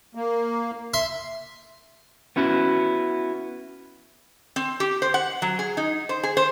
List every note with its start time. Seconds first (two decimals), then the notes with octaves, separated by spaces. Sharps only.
0.15 A#3
0.94 E5 C6
2.36 B3 C#4 E4 F#4
4.56 C4
4.80 G4
5.02 C5
5.14 F#5
5.42 F#3
5.59 G#4
5.77 D#4
6.09 C5
6.23 G#4
6.37 C5